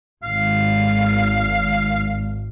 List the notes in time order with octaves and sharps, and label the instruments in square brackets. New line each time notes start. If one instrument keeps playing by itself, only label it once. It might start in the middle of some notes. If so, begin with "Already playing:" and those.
[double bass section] G#1 [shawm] F5